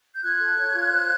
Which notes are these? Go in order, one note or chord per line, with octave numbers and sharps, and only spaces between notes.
G6
F4 F#6 G#6
A4
C#5
F4
C5